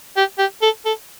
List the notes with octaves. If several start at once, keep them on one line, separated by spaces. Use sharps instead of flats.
G4
G4
A4
A4